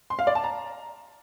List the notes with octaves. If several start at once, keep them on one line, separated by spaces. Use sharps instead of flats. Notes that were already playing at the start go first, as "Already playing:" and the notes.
C6
F5
D5
A5
A#5